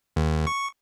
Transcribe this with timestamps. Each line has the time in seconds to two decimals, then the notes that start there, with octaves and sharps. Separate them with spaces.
0.16 D#2
0.47 C#6